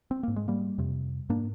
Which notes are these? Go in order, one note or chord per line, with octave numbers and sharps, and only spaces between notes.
C4
G#2 A#3
G#3
G3 A#3
F2 C3
G#2 A#3 D4